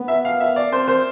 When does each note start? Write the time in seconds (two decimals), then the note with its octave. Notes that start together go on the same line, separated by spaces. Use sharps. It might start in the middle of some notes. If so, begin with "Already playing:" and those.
Already playing: B3
0.08 E5
0.25 F5
0.40 E5
0.56 D5
0.72 C4 C5
0.88 C5